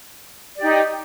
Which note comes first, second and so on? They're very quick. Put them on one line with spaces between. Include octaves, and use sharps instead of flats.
D5 G4 D#4